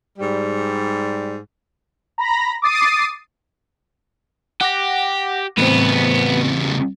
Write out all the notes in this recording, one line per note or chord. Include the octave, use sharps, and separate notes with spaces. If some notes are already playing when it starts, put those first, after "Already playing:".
G#2 G3
A#5 B5 A#6
D6 D#6 A6 C7 D#7
G4 F#5 D6 A#6
E2 A2 C#3 B3 C4